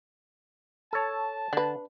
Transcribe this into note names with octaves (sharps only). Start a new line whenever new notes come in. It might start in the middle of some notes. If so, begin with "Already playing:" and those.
A4 C#5 A5
D3 D4 B4